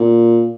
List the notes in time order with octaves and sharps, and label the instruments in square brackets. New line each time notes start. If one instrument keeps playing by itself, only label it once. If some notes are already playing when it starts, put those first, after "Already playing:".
Already playing: [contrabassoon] A#2